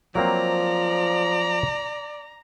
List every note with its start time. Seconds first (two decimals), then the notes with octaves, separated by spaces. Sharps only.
0.15 F3 F#3 A#3 C4 D5 A#5